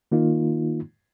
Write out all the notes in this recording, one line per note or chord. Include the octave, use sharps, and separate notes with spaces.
D#3 A#3 D#4 F4